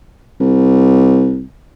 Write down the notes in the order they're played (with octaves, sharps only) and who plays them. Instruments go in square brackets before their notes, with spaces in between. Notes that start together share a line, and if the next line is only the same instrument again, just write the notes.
[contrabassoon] C2